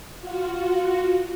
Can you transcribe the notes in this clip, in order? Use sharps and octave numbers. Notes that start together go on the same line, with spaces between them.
F4 F#4